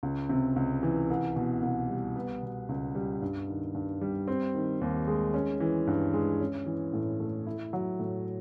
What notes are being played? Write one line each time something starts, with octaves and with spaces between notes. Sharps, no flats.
C#2
C3
C#2
E3
C2
B2
C2
G3
B3
B2
C#2
G3
G2
D#3
G2
G3
C4
D#3
D#2
G#3
C#4
E3
G2
G#3
C#4
E3
A2
A3
E4
F#3
A2